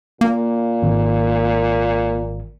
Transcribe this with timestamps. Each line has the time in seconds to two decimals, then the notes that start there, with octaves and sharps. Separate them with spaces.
0.21 A#2 A#3
0.82 G#1